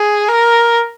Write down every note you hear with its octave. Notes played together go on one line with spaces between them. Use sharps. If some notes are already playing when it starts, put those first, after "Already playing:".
Already playing: G#4
A#4